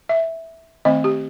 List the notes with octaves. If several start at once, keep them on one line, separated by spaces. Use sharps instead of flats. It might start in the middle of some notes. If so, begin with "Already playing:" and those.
E5
D#3 A3 C4 D#5
G4